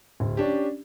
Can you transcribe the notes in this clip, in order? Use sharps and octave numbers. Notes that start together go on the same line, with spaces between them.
D1
C#4 D4 G4